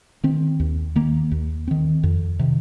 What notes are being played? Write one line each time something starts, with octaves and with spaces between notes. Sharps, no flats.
D#3 C4
D#2
D#3 A#3
D#2
D#3 C4
F2
C3 D#3